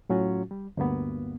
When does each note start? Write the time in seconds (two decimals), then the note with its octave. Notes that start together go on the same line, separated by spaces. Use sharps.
0.09 A2 F#3 C#4 F4 F#4
0.51 G3
0.77 D2 G2 A#3 B3